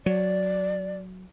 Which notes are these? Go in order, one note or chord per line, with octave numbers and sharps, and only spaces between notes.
F#3 D5